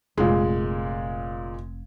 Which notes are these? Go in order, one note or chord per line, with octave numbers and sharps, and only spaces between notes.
F1 A#2 G#3